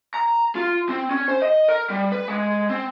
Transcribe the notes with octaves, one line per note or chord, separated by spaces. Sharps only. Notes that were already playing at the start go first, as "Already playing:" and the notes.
A#5
F4
C4
C#4
C5
D#5
A#4
G3
B4
G#3
C4